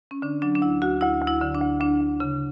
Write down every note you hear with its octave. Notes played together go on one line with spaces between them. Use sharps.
C#4
D3 D4
F#3 D4
D4
D2 E4
D2 F#4
D2 E4
D2
E4
D3
D4
D2
D2 D4
D2
C#3